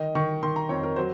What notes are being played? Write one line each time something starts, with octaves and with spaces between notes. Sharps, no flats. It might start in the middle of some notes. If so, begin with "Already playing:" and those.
Already playing: D#3 D#5
D#3 C#6
D#3 C6
A#5
F2 C#5
A#4
F#3 C5